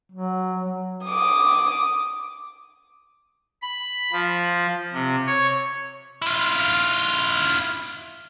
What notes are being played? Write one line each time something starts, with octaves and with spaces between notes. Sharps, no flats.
F#3
D6 D#6
B5
F3
C3
C#5
E4 F4